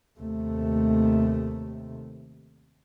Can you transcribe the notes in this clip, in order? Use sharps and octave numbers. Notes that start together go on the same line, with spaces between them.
D#2 C3 A3